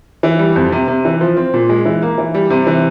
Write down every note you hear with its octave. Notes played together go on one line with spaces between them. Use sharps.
E3
G3
F2
C3
C3
E3
F3
C4
A#2
G#3
E3
A#3
E3
G3
C3
E3